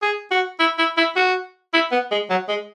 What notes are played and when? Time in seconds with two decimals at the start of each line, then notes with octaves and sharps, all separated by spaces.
0.02 G#4
0.31 F#4
0.60 E4
0.78 E4
0.97 E4
1.16 F#4
1.73 E4
1.92 B3
2.11 G#3
2.30 F#3
2.49 G#3